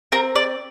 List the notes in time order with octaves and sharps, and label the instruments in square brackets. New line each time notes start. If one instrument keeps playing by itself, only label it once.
[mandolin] C4 A#4
D5